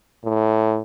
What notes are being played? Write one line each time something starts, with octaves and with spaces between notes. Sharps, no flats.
A2